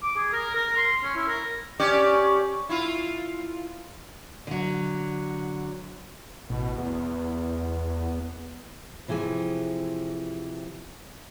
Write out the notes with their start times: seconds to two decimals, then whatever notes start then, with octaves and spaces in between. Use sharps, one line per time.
0.03 D6
0.17 G#4
0.33 A#4
0.55 A#4
0.77 C6
1.04 C#4
1.17 E4
1.28 A#4
1.79 C#4 G4 D5
2.69 E4 F4
4.47 D3 F#3
6.49 A1 B2
6.78 E2 B3
9.08 C3 E3 F3 G#4 G#5